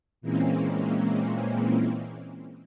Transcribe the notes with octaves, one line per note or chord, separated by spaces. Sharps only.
A#2 E3 G#3 A#3 C4 C#4